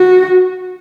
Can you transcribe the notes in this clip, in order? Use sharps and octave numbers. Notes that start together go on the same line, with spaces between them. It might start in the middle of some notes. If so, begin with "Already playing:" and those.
Already playing: F#4